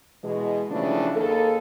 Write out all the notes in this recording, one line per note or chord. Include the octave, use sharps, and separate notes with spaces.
B2 E3 G#3
C#3 E3 F3 G3 A3 D4
D#2 A#3 G#4 A4